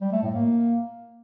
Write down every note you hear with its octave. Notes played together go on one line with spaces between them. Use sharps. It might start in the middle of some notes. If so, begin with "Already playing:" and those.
G3
A3
A2
A#3